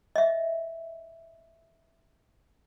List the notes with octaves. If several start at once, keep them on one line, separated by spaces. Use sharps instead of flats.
D#5 E5